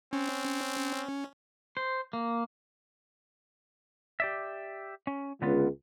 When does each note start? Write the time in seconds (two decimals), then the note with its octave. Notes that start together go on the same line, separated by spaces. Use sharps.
0.13 C4 C#4
1.77 C5
2.13 A#3
4.20 G4 D5 E5
5.07 C#4
5.42 C#2 D3 B3 F4